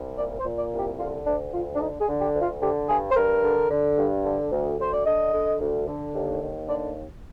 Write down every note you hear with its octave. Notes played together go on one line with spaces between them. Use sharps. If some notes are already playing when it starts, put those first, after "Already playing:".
Already playing: C2
A#2 D5
C5
A#2
D5
C2
G4
D3 F4
D2 D4
D2 F4
D4
D3 D#4
G#4
D3
G4
D2
F4
D3 G4
G2 G#4
C5
G2 A#4
D3
D3
G2
D3
D2
D2 C5
D5
D3 D#5
D3
D2
D3
D#2
D#2
D3 D5